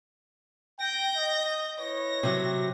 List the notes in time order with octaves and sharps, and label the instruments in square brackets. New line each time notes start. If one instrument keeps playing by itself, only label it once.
[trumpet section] G5 [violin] G6 A#6
[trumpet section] D#5
[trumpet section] E4 B4 C#5 [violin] A#6
[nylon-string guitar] C3 F#3